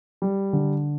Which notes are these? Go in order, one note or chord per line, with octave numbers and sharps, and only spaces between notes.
G3
D3